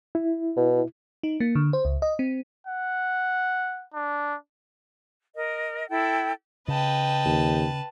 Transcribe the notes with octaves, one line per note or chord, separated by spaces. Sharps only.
E4
B2
D#4
A#3
D3
C5
C#2
D#5
C4
F#5
D4
A#4 D#5
E4 A4 G5
C#3 B4 D#5 G5 A5
D#2